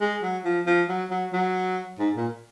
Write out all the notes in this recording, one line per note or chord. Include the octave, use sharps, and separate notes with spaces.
G#3
F#3
F3
F3
F#3
F#3
F#3
G#2
A#2